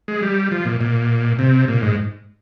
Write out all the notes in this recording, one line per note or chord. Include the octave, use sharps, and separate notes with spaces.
G#3
G3
F3
A#2
A#2
C3
A#2
G#2